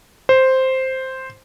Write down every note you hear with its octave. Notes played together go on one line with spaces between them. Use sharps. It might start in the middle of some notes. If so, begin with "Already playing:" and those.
C5